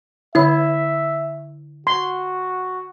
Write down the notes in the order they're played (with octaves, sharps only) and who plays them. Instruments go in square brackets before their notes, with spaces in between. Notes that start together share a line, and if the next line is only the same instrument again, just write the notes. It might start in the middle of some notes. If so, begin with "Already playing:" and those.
[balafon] D3 C#5 [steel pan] E4 [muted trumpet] E5
[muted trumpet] F#4 [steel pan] C6